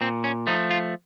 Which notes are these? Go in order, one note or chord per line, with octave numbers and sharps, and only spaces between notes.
A#2 C4
C#4
F3 A3 D#4
F4